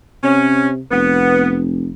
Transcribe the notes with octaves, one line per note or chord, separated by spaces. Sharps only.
C3 C#4
F1 B3